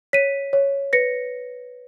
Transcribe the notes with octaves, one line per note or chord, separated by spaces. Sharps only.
C#5 B6 D#7
C#5
B4 A#6 C#7